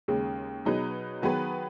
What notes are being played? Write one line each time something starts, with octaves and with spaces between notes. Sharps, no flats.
D#2 C#3 G#3
B2 F#3 D#4 G#4 B4
D#3 F#3 B3 G#4 B4